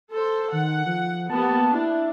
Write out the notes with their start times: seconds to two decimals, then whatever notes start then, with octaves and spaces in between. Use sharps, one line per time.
0.13 A4 C5
0.52 D#3 F#5
0.86 F3
1.30 A#3 B3 G4 A5
1.75 D4 E4